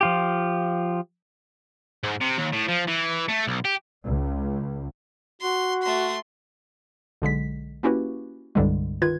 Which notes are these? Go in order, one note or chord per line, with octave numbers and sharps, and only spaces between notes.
F3 F4 G4
G#2
C3
D#2
A2
F3
E3
A3
B1
G4
C#2
F#4 C6
A3 C6
B1 D3 G#3 B6
A#3 C#4 E4 F#4 G4 B4
C2 G2 D3 G3 G#3
D#3 F4 B4 G#6